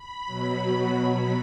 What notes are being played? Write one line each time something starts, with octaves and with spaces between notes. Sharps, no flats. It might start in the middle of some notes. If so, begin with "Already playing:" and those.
Already playing: B5
B2 F#3
B5